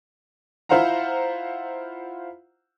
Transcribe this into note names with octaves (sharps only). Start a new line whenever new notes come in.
E4 F4 C5 F5 F#5 A#5